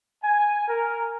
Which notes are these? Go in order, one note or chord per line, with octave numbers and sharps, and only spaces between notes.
G#5
A#4